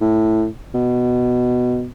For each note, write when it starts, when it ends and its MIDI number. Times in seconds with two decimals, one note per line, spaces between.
0.01 0.47 45
0.75 1.88 47